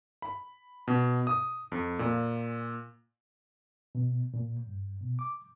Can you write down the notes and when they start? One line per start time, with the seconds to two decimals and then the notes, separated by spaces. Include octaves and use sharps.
0.22 B5
0.88 B2
1.27 D#6
1.72 F2
1.99 A#2
3.95 B2
4.34 A#2
4.67 G2
5.01 B2
5.19 D6